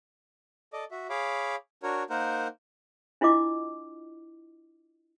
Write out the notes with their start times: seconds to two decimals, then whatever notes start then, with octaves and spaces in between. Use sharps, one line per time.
0.73 A4 D5 D#5
0.91 F#4 E5
1.10 G#4 C#5 F5 B5 D6
1.83 D4 F#4 A#4 C#5
2.10 A#3 D#4 A#4 C5 F#5
3.21 D4 E4 F4 D#5 D6